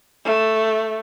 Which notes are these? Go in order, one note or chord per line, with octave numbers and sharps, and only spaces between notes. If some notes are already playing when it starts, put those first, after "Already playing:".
A3